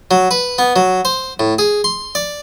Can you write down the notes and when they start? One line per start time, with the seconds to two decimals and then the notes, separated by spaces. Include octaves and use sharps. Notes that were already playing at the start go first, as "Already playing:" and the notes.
0.11 F#3
0.31 B4
0.58 B3
0.76 F#3
1.05 C5
1.40 A2
1.59 G#4
1.84 C6
2.15 D5